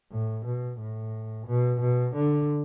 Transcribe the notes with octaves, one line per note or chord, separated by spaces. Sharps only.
A2
B2
A2
B2
B2
D3